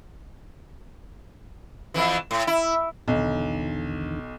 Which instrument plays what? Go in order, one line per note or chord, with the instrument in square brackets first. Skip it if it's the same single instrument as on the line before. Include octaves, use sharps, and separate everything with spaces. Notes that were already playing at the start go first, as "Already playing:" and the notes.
[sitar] F2 E3
A2
E4
[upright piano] B1 [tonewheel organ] E2 D3 D#3